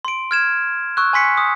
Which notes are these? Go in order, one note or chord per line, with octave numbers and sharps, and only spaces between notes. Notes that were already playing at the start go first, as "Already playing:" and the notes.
C6 D7
F6 G#6 E7
C#6 E6 F#6
G#5 C6 B6 C#7
D#6